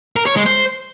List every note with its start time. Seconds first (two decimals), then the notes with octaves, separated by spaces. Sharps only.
0.16 A#4
0.26 C#5
0.36 G#3
0.46 C5